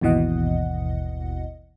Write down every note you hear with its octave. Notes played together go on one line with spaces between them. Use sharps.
G#1 D#2 B2 E3 D#5 F#5